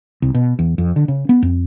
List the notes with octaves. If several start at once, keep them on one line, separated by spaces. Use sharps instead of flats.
C2
B2
E2
F2
D3
C#3
B3
F2